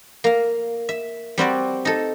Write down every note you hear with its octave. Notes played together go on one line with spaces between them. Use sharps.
A#3 F5
E5
G3 C4 F#4 D5
D#4 A4